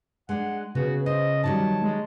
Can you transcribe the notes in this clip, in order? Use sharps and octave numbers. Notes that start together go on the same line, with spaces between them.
G#3 D4 F#5
C#3 B3 F#4
C5 D#5
D#3 F#3 G3 A5
G#3